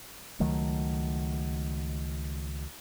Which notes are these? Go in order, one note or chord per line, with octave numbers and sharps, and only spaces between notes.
C#2 D#3 F#3 A3